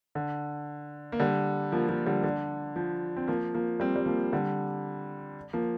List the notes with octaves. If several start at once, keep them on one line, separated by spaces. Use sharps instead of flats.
D3
A#3
D3 G3
F3 A#3
F3 A#3
D3 G3
D3
F3
C4
F3 A#3
F3 A#3
G3 C4
G3
F3 A#3
D3 G3
F3 A#3